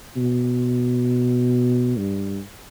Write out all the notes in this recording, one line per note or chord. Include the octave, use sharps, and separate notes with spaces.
B2
G2